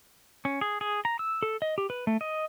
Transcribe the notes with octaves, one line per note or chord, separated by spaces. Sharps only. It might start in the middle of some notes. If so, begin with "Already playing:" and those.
C#4
G#4
G#4
A#5
E6
A4
D#5
G4
B4
A3
D#5